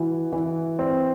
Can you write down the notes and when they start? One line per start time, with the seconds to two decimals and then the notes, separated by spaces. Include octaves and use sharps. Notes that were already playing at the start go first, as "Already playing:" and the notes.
Already playing: E3 F#4
0.32 E3
0.79 C4